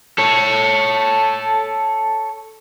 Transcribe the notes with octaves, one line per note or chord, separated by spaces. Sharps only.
A4 C#5